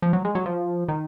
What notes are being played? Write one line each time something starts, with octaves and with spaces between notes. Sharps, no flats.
F3
F#3
G#3
F#3
F3
D#3